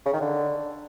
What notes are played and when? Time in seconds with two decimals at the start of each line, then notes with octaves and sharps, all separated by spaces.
0.06 C#3
0.13 D#3
0.21 D3